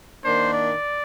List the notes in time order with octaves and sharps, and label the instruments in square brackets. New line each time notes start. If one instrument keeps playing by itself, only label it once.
[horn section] D#3 A#3 D4 C5
D5